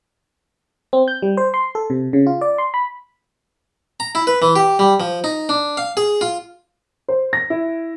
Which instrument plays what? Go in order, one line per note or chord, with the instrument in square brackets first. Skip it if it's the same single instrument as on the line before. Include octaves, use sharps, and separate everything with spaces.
[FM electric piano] C4
G6
G3
C5
C6
A4
C3
C#3
F4
D5
C6
B5
[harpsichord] A#5
E4
B4
E3
G4
G3
F3
D#4
D4
F5
G#4
F4
[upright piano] C5
A#6
E4